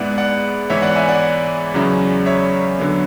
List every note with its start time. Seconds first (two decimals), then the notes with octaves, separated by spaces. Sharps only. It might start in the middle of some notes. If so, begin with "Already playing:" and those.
Already playing: G#2 G#3 B3 E4 D5 F#5
0.18 D5 F#5
0.70 G#2 E3 B3 C#5 E5
0.82 D5 F#5
0.96 E5 G#5
1.09 D5 F#5
1.74 E2 C#3 F#3 C#4 E4
2.26 C#5 E5
2.79 D3 F#3 B3